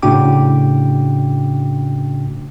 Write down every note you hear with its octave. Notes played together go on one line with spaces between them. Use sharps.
A2 C#3 D4 F#4 G5 D6